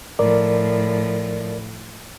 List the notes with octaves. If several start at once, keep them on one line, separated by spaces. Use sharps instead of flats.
A2 F3 A#4 D5